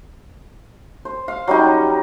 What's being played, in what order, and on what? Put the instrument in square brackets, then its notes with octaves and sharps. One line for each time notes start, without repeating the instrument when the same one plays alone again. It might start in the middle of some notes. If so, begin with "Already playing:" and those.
[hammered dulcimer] C5
F5
F#3 G3 C#4 D#4